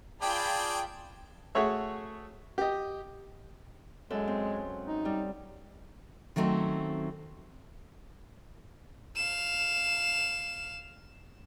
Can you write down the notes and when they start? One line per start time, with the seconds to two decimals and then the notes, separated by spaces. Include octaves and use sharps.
0.21 F4 G#4 D5 G5 A5 B5
1.55 A3 F#4 G#4 C#5 E5
2.58 G4 D#5
4.10 F#2 G#3 A4
4.28 C4
4.88 D#4
5.05 G3
6.36 D#3 F#3 A3 C4 C#4
9.16 F5 E7